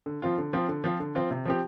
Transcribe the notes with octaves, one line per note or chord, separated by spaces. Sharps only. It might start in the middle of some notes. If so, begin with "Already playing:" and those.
D3
F3 C4 F4
D3
F3 C4 F4
D3
F3 C4 F4
D3
F3 C4 F4
C3
F3 C4 G4